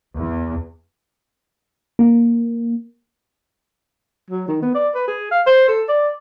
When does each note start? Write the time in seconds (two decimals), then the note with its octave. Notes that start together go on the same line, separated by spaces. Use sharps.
0.17 E2
1.99 A#3
4.31 F#3
4.48 D#3
4.62 B3
4.74 D5
4.95 B4
5.07 G#4
5.31 F5
5.46 C5
5.68 A4
5.89 D5